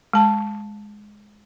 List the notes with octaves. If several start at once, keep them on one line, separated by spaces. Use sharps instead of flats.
G#3 A5